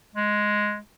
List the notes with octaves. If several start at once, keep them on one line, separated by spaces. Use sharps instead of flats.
G#3